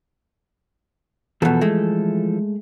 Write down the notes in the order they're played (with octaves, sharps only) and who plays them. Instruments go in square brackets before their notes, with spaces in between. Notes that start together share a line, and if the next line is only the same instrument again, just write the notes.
[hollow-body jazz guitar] E2 B2 [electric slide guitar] E3 F3 A4
[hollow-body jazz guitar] G#3 A3